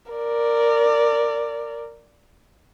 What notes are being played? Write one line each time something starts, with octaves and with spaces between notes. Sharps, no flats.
A#4 D5